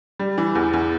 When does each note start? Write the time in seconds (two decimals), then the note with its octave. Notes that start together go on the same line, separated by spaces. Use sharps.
0.19 G3
0.38 E3
0.55 E2
0.73 E2